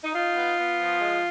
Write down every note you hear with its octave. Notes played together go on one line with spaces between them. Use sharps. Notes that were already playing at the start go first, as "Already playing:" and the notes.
D#4
D#4 F4
B3
B3
F3
G#3